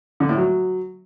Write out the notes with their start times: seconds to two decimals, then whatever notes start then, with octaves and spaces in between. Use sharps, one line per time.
0.20 D3
0.29 A2
0.38 F#3